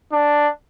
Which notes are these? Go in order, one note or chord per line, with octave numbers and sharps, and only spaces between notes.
D4